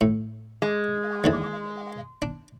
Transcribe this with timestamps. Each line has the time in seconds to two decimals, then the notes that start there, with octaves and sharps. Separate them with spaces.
0.01 A2
0.62 G#3
1.24 D#2 D3 E3
2.22 D4